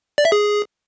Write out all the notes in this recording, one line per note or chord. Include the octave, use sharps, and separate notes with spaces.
D5
E5
G#4